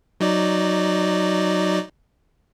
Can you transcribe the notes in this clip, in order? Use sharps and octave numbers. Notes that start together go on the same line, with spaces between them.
F#3 D#4 D5